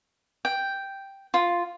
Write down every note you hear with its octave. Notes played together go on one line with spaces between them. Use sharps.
G5
F4